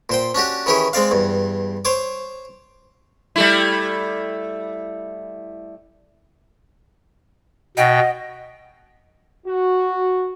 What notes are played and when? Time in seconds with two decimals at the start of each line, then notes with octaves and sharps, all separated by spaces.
0.09 A#2 C5 G5
0.35 C#4 D4 F#4 G4
0.66 D#3 E3 C#4 E4 G4 G#4
0.93 G#3 C4 D5 F5
1.11 E2 G2
1.85 C5 C#5 D6
3.36 G3 A3 E4
7.77 B2 D#5 F#5 G5
9.47 F#4